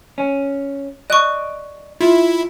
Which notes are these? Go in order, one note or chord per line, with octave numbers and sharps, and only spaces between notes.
C#4
D5 D#5 C#6 F#6
E4 F4